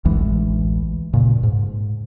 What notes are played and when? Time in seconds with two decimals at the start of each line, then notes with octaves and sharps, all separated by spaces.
0.05 A1 D2 E3 G#3
1.13 A#2 C#3
1.43 G#2